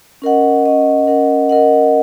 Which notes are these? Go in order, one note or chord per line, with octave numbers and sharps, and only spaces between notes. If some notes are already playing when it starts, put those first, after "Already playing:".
C#4 A#4 D#5 F#5
C#4 A#4 D#5 F#5
C#4 A#4 D#5 F#5
C#4 A#4 D#5 F#5